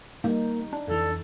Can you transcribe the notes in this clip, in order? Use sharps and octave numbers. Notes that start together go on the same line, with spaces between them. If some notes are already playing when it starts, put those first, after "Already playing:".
G3 A#3 D#4
D4
F2 E3 A4